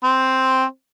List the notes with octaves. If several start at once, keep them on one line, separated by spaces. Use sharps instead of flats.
C4